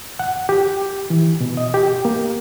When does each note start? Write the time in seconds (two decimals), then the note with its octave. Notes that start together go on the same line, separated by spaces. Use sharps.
0.19 F#5
0.49 G4
1.10 E3
1.41 B2
1.57 D#5
1.74 G4
2.05 A#3